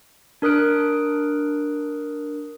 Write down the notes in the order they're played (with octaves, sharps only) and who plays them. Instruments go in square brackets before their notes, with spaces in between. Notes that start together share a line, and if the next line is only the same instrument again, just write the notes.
[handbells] D4 A#4 D#6 F#6 D7